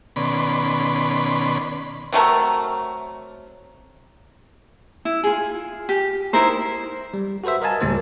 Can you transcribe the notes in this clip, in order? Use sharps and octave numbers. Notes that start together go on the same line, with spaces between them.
B2 D#3 C#4 D5 B5 C6
C3 F#3 A3 A#4
E4
F4 G#4
G4
D#4 E4 A#4 C5
G3
F#4 A4 B4 C5 E5
A#4 D#5 F5 G#5 A5
C#2 A2 G3 A#3 F4 C5